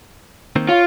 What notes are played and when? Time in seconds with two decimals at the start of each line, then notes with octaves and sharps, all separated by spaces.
0.56 D#3 A#3 C4
0.69 F4 C#5